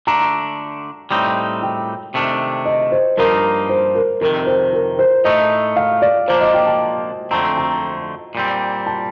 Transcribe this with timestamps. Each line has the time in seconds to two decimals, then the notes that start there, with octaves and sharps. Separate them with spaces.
0.07 D3 A3 D4 A#5
1.11 A2 G3 C4 D#4
1.62 G5
2.14 C3 D#3 A3 D4
2.66 D#5
2.92 C5
3.17 G2 F3 A#3 D#4 A#4
3.69 C5
3.95 A#4
4.21 F2 C3 D#3 A#4
4.47 C5
4.73 A#4
4.99 C5
5.25 A2 A3 D#4 D#5
5.76 F5
6.02 D5
6.28 A#2 F3 A#3 D4 C5
6.41 D#5
6.54 G5
6.67 A5
7.31 F2 D3 A3 C4 A#5
7.58 A#5
8.35 A#2 G3 C4
8.87 A5